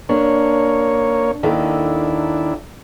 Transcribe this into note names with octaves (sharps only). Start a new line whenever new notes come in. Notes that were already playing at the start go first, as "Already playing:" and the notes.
A#3 C#4 D4 C#5
D#2 D#3 D4 E4 A4